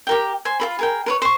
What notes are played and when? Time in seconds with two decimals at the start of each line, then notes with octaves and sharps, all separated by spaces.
0.07 G4 A#4 G5
0.45 C5 G#5
0.60 F4 A#4 B5
0.79 G#4 A#4 G5
1.06 A#4 B4 C#5
1.22 C5 C#6